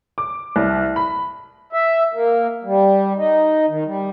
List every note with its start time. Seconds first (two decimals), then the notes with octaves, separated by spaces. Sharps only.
0.18 D6
0.56 C2
0.96 B5
1.73 E5
2.13 A#3
2.64 G3
3.17 D#4
3.68 D#3
3.85 G3